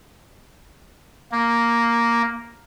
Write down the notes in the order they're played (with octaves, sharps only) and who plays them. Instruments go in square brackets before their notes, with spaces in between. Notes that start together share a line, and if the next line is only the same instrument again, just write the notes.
[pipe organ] A#3